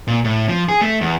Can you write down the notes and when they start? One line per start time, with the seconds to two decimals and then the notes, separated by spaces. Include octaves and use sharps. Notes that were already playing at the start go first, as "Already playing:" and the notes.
0.08 A#2
0.25 A2
0.49 F3
0.69 G#4
0.81 A3
1.01 E2